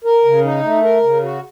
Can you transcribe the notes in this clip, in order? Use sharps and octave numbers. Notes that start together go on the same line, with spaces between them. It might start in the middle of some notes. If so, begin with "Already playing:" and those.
A#4
C#3
D#4
A3
A#4
C#3
F#4